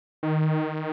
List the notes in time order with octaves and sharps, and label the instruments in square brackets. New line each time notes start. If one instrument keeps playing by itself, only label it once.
[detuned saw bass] D#3